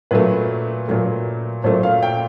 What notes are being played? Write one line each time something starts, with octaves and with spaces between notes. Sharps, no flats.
A#2 F#3 A3 B4
A#2 F#3 A3
A#2 F#3 A3 C5
F5
G5